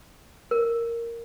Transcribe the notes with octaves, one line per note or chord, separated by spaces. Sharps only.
A#4